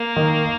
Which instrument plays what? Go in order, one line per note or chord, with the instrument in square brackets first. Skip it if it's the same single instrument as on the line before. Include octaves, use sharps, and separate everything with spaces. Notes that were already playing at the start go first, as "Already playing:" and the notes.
Already playing: [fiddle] A#3
[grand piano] D#3